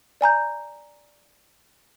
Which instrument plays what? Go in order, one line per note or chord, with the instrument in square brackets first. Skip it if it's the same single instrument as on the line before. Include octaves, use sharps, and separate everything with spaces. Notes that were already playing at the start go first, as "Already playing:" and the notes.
[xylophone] D5 G#5 A#5 G6